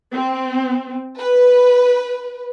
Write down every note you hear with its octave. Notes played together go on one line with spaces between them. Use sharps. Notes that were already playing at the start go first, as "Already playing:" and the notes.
C4
B4